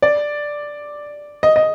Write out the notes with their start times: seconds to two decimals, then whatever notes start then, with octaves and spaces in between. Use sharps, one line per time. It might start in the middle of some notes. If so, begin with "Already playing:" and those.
0.02 D5
1.43 D#5
1.56 D#5